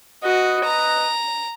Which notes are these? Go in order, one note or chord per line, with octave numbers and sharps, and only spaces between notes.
B3 F#4 B4 D#5
A#5